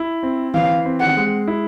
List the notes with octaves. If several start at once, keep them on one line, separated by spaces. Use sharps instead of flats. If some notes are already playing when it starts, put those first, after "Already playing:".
Already playing: E4
C4
E3 F5
C4
F#5
G#3
E4